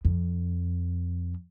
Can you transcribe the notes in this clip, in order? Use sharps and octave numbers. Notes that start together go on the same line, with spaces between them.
F2